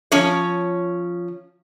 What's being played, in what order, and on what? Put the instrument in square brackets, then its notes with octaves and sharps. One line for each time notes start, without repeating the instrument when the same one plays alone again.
[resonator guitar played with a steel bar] F3 C#4 C#5